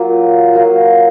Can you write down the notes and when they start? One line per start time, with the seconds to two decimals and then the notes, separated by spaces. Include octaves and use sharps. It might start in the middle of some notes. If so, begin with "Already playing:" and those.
Already playing: F#3 A#3 F4
0.54 F#3 A#3 F4